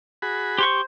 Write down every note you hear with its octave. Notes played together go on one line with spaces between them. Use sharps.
F#4 G#4 B5
G4 C5 C6 C#6